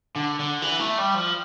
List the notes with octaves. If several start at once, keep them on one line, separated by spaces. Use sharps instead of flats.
D3
D3
E3
A3
G3
F3